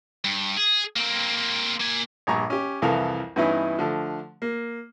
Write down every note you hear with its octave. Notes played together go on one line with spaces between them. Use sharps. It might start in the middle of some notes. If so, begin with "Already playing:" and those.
G2
G#4
A#3 C4
A#3 G#5
A#1 G2 G#5 A#5 C#6
C#4 G4
C2 F2 E3 A4 A#4 F5
G2 E3 B3 C#4 D#4 E4
D3 F3 A3
A#3